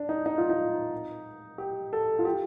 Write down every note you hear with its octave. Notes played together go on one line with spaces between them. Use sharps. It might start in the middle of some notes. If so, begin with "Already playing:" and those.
Already playing: D4
D#4
D#4
F4
D#4
G4
A4
F4
G4